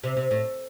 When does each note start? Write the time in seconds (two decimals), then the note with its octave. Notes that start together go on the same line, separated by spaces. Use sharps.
0.04 C3
0.17 C3
0.31 A2